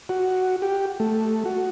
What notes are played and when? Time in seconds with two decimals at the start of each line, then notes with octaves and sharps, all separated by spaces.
0.09 F#4
0.62 G4
1.00 A3
1.46 F#4